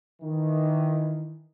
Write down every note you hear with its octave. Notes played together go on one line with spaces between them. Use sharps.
D#3 E3